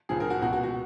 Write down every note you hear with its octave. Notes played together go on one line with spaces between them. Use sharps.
C#2 C#3 F3 G#4
A#4
F#4
C#2 B2 F#4
F#4
F#4